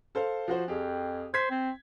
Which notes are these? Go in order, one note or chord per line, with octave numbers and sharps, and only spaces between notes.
A4 C5 F5
F3 F#4 C5
F2 G4 G#4
C5 G#6 B6
C4